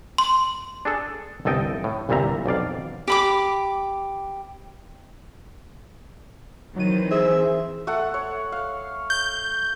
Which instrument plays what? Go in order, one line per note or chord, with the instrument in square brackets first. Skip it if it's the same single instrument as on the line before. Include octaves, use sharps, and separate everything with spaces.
[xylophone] C6
[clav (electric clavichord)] D4 G#4 A4
G1 C2 A4 D#5 G5
A2
G1 C2 A#2 G3 E5 A#5
B1 F2 D5 F5
[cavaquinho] G4 B5 D6
[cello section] D#3 E3 C4 [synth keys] F#3 D#7
[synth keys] G#4 [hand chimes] C5 [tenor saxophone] E5
[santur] A3 A4 F#5
C#5
F5
[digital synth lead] G6